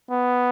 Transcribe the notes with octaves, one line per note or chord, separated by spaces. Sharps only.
B3